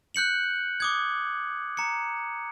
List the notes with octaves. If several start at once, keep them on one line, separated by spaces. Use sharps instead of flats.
F#6 G6 C#7 F#7
D6 D#6 G#6
A#5 C#7